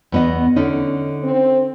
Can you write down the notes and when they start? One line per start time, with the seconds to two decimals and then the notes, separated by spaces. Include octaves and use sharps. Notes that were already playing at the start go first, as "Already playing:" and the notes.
0.12 E2 B3 D#5
0.56 D3 C#4 D#4
1.23 C4